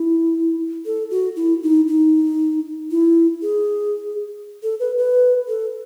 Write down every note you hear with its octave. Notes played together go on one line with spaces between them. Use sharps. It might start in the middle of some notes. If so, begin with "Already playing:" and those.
Already playing: E4
A4
F#4
E4
D#4
D#4
E4
G#4
A4
B4
B4
A4